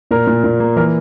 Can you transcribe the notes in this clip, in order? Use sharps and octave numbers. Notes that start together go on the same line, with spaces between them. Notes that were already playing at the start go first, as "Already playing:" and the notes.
A#2 A#4
A#2
A#2
A#3
E3 A#4